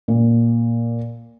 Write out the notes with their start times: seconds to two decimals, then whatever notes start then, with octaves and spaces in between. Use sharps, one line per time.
0.08 A#2